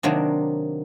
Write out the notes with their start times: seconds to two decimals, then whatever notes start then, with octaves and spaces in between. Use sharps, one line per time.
0.03 C3 D#3 F#3 A#3 D4